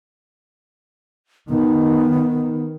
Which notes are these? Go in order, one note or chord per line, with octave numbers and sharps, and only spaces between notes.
D#3 B3